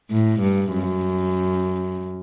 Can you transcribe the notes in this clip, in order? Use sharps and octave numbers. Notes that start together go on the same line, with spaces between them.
A2
G2
F#2